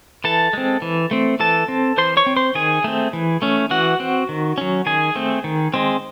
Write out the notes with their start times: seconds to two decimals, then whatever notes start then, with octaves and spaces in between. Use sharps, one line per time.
0.24 E3 A4 A5
0.53 G#3 C4
0.82 E3
1.11 A3 C4
1.40 E3 A4 A5
1.68 C4
1.97 E3 C5 C6
2.17 C#5 C#6
2.26 C4
2.36 C5 C6
2.55 D#3 G#4 G#5
2.84 A3 C4
3.13 E3
3.42 A3 C#4
3.71 E3 F#4 F#5
4.00 C4
4.29 D#3
4.58 F#3 C#4
4.86 D#3 G#4 G#5
5.16 A3 C4
5.44 D#3
5.74 G#3 C4